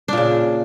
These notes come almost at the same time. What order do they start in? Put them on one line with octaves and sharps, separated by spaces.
D4 A#2 C#3